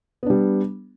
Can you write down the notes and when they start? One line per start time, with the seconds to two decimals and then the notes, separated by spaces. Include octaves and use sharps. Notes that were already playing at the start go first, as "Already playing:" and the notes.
0.23 B3
0.26 D4
0.30 G3